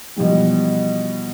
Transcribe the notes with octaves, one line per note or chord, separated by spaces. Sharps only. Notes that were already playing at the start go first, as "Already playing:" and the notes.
B2 E3 F3 G3